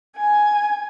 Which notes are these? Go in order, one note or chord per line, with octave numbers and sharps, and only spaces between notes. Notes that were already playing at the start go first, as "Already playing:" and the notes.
G#5